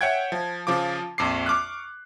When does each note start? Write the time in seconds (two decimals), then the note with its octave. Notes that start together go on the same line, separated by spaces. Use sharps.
0.01 C#5 E5 F#5 G5 G#6
0.32 F3
0.67 C#3 F3 F4 D6
1.18 A#1 F2 D6 C7
1.46 C#6 D6 F6 F#6